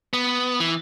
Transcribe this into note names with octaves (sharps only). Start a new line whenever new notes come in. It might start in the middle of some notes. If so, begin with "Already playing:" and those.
B3
E3